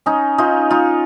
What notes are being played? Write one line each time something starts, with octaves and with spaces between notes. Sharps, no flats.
C#4 D#4
D#4 F4
D#4 F4